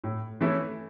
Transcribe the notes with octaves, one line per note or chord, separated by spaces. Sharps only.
A2
E3 A3 C#4 E4